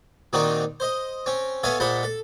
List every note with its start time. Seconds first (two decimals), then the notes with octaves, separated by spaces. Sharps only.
0.33 A#2 D#3 C4 D4 D#4 F#4
0.80 C5 D#5
1.26 C4 C#4
1.63 B3 A4 C#5 E5 F5 G#5
1.80 A#2 G#3 C5 F#5 A5 B5
2.03 A4